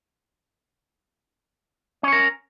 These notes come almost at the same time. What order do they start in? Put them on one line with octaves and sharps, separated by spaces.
C#4 C#5 A#4